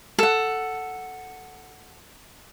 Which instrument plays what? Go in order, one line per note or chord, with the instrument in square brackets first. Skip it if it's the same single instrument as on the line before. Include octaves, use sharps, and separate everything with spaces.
[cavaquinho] A4 F#5